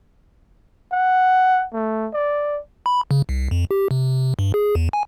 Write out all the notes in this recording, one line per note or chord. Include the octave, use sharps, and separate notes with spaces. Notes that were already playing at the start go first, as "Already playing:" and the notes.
F#5
A3
D5
B5
C#3
C2
F2
G4
C3
G2
G#4
E2
G#5